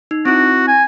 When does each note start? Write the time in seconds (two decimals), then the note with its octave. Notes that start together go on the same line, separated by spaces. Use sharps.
0.11 D#4
0.25 C4 E4 F#4
0.68 G#5